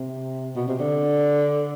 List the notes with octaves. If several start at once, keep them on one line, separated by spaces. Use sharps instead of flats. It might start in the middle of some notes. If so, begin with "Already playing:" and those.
Already playing: C3
B2
C3
D3